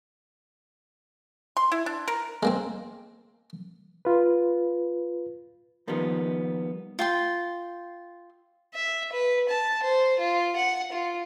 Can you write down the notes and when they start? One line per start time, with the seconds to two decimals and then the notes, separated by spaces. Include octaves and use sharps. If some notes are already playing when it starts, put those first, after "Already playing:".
1.57 C6
1.72 E4
1.86 D4
2.08 A#4
2.43 G#3 A#3 C4
4.05 F4 B4
5.87 D#3 F3 G3 A#3 B3 D#4
6.99 F4 G5 C6
8.74 E5
9.12 B4
9.50 A5
9.83 C5
10.19 F4
10.56 F#5
10.92 F4